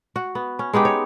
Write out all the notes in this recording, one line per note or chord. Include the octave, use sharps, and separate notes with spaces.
F#4
B3
C#4
G#3 B3 D#4 G4
C#5